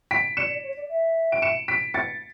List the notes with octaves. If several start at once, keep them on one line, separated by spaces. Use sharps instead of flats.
B6 D7
D5 C#7 E7
D5
C#5
D5
E5
D7
C#7 E7
B6 D7
A6 C#7